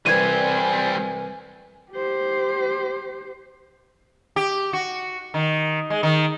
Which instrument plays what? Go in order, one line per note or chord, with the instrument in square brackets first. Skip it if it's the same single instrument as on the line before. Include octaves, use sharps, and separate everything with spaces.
[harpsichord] C2 E3 [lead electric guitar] G3 C5 [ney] G#5 [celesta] G#6 D#7
[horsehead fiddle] G4 C5
[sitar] G4
F#4
D#3
G#3
D#3